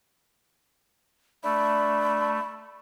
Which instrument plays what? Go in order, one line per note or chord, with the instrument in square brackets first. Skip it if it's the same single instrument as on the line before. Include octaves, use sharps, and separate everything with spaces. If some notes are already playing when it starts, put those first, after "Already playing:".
[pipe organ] A3 [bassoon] D4 [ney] B5